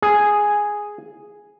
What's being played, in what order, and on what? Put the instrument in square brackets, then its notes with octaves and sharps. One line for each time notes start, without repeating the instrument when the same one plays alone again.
[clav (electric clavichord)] G#4